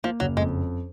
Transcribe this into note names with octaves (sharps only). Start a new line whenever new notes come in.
F3 A#3
F#1 F#3
F2 G#3